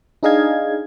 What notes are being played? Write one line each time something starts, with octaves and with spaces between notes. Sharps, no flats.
D4 D#4 G#4 D#5 F5 G#6